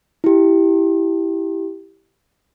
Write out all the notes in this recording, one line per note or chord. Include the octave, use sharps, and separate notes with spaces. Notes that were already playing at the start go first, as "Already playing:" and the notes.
E4 G4